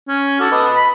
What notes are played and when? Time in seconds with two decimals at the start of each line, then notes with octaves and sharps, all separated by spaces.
0.08 C#4
0.41 F#4 A4 D6
0.52 B4 D#5
0.76 B5